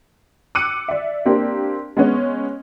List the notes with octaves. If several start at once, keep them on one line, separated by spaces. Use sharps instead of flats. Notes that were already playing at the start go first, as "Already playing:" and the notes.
D6 E6 F#6 C#7 D#7
D5 E5
A#3 C4 D4 G4
G#3 B3 C#4